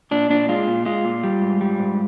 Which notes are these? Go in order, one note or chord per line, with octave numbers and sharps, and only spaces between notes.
A#2 D4
A#2 D4
G#3 F4
A#2
G#3 F4
A#2
G3
G#2
G3
G#2